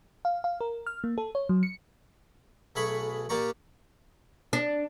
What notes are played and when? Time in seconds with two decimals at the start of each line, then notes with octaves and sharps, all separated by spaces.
0.25 F5
0.44 F5
0.61 A#4
0.87 F6
1.04 A#3
1.18 A4
1.35 C#5
1.49 F#3
1.63 C#7
2.76 B1 A3 G#4 B5 C#6
3.29 A#2 A#3 G4 D5 A#5 C#6
4.53 D4